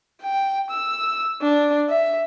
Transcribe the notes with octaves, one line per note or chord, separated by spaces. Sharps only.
G5
E6
D4
E5